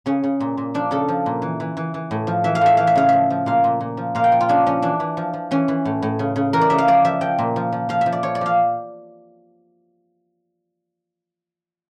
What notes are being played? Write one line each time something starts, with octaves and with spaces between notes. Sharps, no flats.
C#3 C#4
C#3
A#2
A#2
F3 D4
C#3 A4
F3
A#2
E3
E3
E3
E3
A2
F3
E3 E5
F5
A2 E5
E3 F5
E5
C#3 F5
F3 E5
F3
A#2 F5
A#2
A#2
F3
A#2 F5
G5
F3
F4
C#3 D4
F3 C#4
E3 D4
E3
F3
F3
E3 C#4
E3
A2
A2
C#3
C#3
E3 A#4
D5
C#3 E5
F5
F3 D5
F3 E5
F3 G5
A#2
F3
F3
F3 F5
F3 E5
D5
F3 C#5
D5
F3 F5